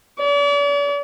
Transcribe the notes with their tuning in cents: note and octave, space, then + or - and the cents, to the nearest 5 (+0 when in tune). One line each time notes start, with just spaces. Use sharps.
D5 -45